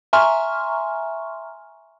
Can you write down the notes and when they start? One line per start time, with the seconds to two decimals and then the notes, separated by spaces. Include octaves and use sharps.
0.13 E5 G#5 A#5 C6 C#6 F6